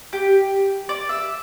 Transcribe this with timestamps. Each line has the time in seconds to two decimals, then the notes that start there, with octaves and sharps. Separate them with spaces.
0.13 G4
0.89 D5
1.09 E5